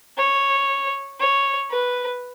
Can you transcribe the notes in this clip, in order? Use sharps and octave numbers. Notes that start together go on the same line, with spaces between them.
C#5
C#5
B4